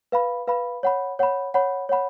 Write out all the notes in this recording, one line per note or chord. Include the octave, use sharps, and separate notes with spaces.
B4 F5 B5
B4 F5 B5
C#5 F#5 B5
C#5 F#5 B5
C#5 F#5 B5
C#5 F#5 B5